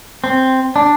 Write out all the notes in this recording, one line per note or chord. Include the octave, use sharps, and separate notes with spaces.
C4
D4